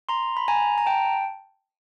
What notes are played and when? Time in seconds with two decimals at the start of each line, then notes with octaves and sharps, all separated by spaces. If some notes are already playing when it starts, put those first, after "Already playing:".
0.09 A#5 C6
0.37 B5
0.48 G#5 A#5
0.78 A#5
0.86 G5 A5